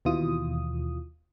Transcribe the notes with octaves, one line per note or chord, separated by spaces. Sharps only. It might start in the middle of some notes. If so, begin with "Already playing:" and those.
D#2 B2 E3 F4 D#6